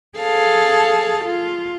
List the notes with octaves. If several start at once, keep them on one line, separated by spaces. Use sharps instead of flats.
G#4 A4 F5 A5
F4